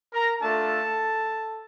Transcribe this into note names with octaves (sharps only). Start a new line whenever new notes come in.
A#4 A#5
A3 D4 F4 A4 A5